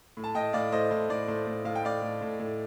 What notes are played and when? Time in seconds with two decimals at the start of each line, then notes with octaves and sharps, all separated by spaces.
0.17 A2
0.24 A5
0.35 A2 D#5 G5
0.53 A2 D5 F5
0.72 A2 C5 D#5
0.91 A2 C5
1.10 A2 D5
1.28 A2 C5
1.47 A2
1.65 A2 F5
1.75 G5
1.83 A2 D5 F5
2.02 A2
2.21 A2
2.39 A2